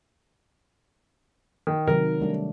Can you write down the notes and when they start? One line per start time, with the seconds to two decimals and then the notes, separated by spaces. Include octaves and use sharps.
1.67 D#3
1.87 C3 D#3 F#3 A#4
2.20 G3 A3 D4